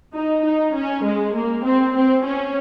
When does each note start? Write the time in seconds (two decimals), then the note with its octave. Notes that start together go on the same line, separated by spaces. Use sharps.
0.14 D#4
0.44 D#4
0.74 C#4
1.04 G#3
1.35 A#3
1.64 C4
1.95 C4
2.25 C#4